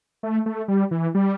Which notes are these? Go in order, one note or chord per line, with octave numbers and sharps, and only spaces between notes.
A3
A3
G3
E3
G3